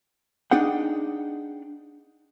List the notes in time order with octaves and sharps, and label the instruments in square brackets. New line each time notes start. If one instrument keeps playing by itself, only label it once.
[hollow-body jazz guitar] D4 D#4 G#4 F#5 G5